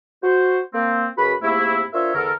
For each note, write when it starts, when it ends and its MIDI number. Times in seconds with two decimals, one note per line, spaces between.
0.23 0.59 66
0.23 0.59 72
0.74 1.06 58
0.74 1.06 60
1.17 1.33 42
1.17 1.33 49
1.17 1.33 66
1.17 1.33 71
1.17 1.33 83
1.43 1.83 44
1.43 1.83 48
1.43 1.83 57
1.43 1.83 58
1.43 1.83 64
1.93 2.15 62
1.93 2.15 65
1.93 2.15 70
1.93 2.15 72
1.93 2.15 73
1.93 2.15 76
2.15 2.33 40
2.15 2.33 50
2.15 2.33 69
2.15 2.33 70